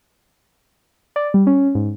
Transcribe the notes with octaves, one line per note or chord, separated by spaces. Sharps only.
D5
G3
C#4
G#2